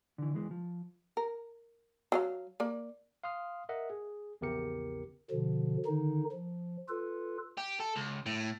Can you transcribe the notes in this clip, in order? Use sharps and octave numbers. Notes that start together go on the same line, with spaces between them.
D3 E3
E2 E3 G#3
F3
A#4
F#3 G#4 F5
A#3 D5
F5 C6 D#6 F6
A#4 D#5 E5 F#5
G#4
A#1 E2 C#3 G4 A#4 C#7
B2 D3 F3
D3 D#3 D#4
F3
F4 A4 B4
G4
A4
C#2
A2